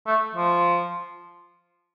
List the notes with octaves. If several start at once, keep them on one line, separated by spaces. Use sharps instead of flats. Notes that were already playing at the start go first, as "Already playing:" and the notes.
A3
F3